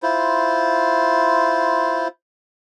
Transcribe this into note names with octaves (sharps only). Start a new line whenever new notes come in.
E4 F4 C5